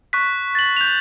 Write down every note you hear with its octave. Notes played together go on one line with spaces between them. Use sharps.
C#6 F#6 B6
A6 F#7
G6 F7